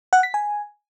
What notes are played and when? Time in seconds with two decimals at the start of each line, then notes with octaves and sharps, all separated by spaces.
0.13 F#5
0.23 B6
0.34 G#5